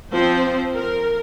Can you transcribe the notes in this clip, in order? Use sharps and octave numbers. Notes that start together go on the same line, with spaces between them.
F3 C4 C5
A#4